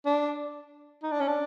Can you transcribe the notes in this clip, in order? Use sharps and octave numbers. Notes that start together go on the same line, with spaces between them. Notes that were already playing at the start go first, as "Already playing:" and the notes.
D4
D#4
D4
C#4
D4